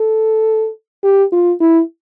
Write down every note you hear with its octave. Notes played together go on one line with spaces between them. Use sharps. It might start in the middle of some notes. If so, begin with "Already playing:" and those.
Already playing: A4
G4
F4
E4